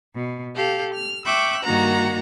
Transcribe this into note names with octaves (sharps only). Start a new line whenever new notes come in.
B2
G4 A4 F5
F6
E5 G5 C#6 D6 E6 F#6
G2 D#3 A#3 F#4 F#5 A#5